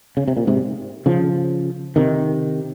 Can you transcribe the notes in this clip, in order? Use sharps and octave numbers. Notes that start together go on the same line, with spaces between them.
C#3
C3
A#2
G#2 C3
C#3 F3
C3 D#3